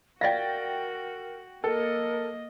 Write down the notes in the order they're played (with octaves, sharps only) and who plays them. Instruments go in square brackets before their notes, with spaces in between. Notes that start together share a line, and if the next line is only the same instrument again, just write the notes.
[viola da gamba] F#4 [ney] A#4 [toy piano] D5 F5 [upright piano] G5 A6 A#6
[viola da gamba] A#3 D#5 [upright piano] A4 [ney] A#4